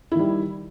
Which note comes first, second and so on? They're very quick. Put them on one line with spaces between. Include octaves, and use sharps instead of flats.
E4 D#3 G3